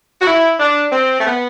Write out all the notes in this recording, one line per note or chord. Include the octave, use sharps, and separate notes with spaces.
F#4
E4
D4
C4
A3
B3